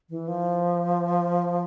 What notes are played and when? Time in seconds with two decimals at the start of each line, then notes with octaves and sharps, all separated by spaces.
0.10 E3
0.28 F3